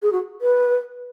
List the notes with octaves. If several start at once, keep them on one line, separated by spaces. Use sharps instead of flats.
G#4
F#4
B4